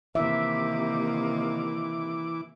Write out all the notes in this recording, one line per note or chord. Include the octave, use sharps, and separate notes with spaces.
C3 D#3 E3 A#3 E5 D6